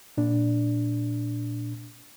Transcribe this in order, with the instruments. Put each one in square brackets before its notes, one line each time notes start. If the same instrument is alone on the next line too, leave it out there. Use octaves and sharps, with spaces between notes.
[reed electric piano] A#2 D4